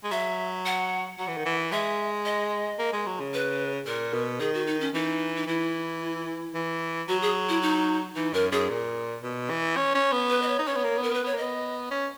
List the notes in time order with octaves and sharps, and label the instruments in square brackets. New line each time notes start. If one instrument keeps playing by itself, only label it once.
[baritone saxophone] G#3
[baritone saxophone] F#3 [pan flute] E5
[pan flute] F#5
[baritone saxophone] F#3 [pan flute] F#5
[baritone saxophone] E3
D#3
E3
[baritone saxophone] G#3 [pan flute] E5
[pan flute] D#5
[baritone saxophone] A#3
G#3
F#3
C#3
[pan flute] B4
[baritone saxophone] A#2 [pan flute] A#4
[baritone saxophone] B2
[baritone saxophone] D#3 [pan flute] G#4
[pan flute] F#4
D#4
C#4
[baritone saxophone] E3 [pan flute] D#4
[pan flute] D#4
[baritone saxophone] E3 [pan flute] E4
[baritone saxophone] E3
[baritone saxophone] F#3 [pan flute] F#4
[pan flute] G#4
E4
D#4
[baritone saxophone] E3 [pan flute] D#4
[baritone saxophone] F#2 [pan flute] A#4
[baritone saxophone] F#2 [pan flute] G#4
[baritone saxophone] A#2
B2
E3
C#4
C#4
B3
[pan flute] B4
D#5
C#5
[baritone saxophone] D#4
[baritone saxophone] C#4 [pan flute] C#5
[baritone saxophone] B3
A#3
B3
[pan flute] A#4
[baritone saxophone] B3 [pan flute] B4
[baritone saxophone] B3 [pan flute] C#5
[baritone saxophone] A#3
[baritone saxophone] B3 [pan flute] D#5
[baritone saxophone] C#4